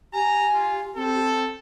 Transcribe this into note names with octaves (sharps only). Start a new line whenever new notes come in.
G4 G#5 A#5
F4
C4 A4